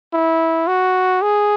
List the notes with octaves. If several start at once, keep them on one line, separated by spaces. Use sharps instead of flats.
E4
F#4
G#4